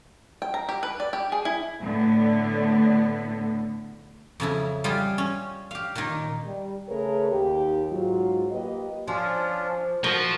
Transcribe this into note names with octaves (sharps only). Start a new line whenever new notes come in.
G5
A#5
G4
B4
D5
G4
G#4
E4
A2 D3 B3
F2 C#3 E4
G3 F4 G4 G#4
C#4
G4 F5
A#2 D#3
G3
C#3 A3 G#4 A#4 B4 C#5
D#2 D#3 G4
G#2 F#3 F4
A#3 G4 B4 D#5
F3 C#4 D4 F4
F3 F#4 A#4